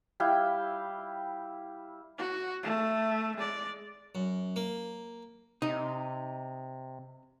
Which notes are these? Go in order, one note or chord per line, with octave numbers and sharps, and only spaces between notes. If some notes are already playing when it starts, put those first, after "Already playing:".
G3 E4 F5 G5
F#4
A3
G#3 D5
F#2
A#3
C3 D#4